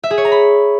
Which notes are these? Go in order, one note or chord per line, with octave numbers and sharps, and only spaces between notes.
E5
G#4
C#5
A#5
B5